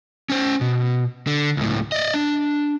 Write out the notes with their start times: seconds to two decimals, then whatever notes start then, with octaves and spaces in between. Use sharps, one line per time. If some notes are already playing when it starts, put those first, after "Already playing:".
0.30 C#4 C5
0.61 B2
1.27 D3
1.57 C#2 A2
1.92 D5 D#5
2.14 D4